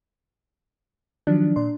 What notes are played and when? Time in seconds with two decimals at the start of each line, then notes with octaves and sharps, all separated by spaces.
1.27 D#3 F3 F#3 D4
1.56 A#2 D5 C6